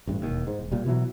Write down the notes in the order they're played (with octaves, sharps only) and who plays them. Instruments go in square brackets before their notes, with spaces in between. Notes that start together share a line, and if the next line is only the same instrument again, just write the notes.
[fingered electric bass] A1 G2
E1 D#2
G#2
D#1
A#2 G3
B2 E3 F#3